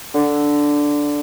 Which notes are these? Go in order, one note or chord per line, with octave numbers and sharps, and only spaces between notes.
D3